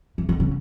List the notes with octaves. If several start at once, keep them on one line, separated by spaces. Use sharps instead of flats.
E3
D#3
C#3